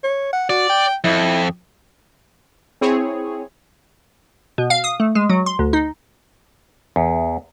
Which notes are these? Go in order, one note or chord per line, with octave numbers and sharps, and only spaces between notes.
C#5
F#5
F#4 D5
G5
F2 E4
C4 E4 G#4 C#5
B2
F5
D#6
A3
G#3
F#3
C6
D2
D#4
E2